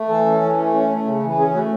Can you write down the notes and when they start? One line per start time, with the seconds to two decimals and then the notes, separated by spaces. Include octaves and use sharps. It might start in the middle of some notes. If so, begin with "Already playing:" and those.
Already playing: A3
0.09 E3 A4
0.26 C#4
0.41 E3
0.58 A3
0.74 C#4
0.90 A3
1.06 C#3
1.23 E3
1.39 C#4 G#4
1.54 A3 F#4